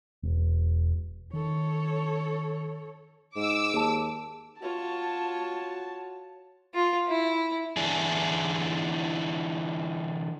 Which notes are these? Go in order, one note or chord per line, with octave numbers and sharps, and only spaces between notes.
E1
D#3 A4 C#5
G#2 D6 E6
D#2 G#4 A5
F4 F#4 C#5 A5
F4
E4
D3 E3 D4 E4 G#4